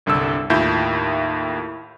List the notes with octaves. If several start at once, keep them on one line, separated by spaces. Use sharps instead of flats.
G1 C2 D3 A4 E6
D#2 A2 E4 F4 G6